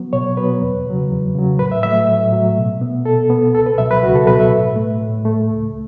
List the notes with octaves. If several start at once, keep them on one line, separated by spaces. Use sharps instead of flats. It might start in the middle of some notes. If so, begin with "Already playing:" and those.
Already playing: F#3 B3
B2 C#5
F#3 B3 B4
E2
C#3 F#3
E2
C#3 F#3
A2 B4
E5
F#3 A3 E5
A2
F#3 A3
B2
B3
B2 A4
B3
C#2 A4
B4
B2 F#3 E5
B4
C#2 F#4
A4
B2 F#3 B4
E5
A2
A3
A2
A3
C#2